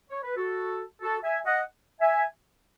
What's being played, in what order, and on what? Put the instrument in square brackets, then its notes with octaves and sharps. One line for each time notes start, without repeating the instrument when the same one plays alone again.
[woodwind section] C#5
B4
F#4 A4
F#4 A4
E5 G#5
D#5 F#5
E5 G#5